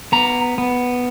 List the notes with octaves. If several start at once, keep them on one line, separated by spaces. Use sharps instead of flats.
B3 A#5
B3